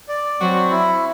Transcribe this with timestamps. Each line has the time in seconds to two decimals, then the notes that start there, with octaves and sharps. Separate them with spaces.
0.09 D5
0.40 F#3 C4 F#4
0.71 E4